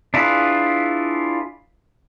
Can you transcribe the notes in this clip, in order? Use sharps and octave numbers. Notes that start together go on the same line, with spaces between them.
D4 E4 F4 G#4 B4